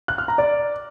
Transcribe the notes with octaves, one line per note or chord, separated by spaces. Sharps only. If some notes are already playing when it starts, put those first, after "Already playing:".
F#6
F6
A#5
D5